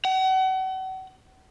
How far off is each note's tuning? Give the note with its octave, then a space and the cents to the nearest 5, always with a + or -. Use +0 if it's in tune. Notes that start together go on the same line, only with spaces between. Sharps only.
F#5 +35